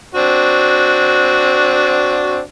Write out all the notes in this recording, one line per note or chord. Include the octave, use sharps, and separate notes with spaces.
C4 D4 F#4